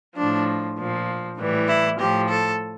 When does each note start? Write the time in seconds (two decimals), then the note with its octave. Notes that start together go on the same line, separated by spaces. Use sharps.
0.17 A2 F3 D4
0.78 A#2 F3
1.39 A2 E3 G3
1.68 E4
1.99 A2 F3 G4
2.29 A4